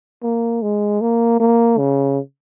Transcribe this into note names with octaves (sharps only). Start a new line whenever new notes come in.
A#3
G#3
A#3
A#3
C#3